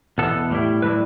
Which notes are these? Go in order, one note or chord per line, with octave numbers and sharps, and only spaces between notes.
E2 B2 B3 A4
A2 G3 E4
A2 G3 E4 B4